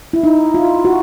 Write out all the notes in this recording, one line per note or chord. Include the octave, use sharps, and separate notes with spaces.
E4
D#4
F4
F#4